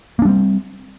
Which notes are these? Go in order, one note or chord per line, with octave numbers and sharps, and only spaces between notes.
G3 A#3 C4 D4